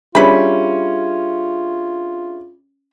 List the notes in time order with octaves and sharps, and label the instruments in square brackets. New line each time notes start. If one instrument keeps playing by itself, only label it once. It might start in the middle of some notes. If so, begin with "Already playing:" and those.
[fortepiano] G3 C#4 [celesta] D4 G#4 E5 [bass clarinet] F4 [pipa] B4 B5